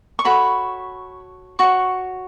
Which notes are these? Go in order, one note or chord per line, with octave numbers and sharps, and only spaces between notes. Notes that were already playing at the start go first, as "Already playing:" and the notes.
C#6
F#4 A4 C#5 B5
F#4 C#5 C#6